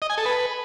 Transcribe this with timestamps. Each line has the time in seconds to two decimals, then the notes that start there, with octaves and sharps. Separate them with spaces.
0.02 D#5
0.10 G#5
0.18 A4
0.25 B4